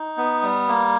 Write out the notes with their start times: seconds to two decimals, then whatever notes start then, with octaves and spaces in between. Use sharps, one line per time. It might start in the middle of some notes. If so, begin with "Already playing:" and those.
Already playing: D#4
0.17 B3
0.43 G3
0.68 A#3